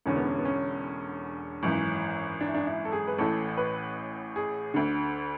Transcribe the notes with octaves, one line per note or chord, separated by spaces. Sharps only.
E1 E2 D3 C#4
B3
C#4
B3
C#4
G#1 F#2 E3
D4
E4
D4
E4
A4
G#4
B4
A1 A2 E3 A4
B4
G#4
D2 D3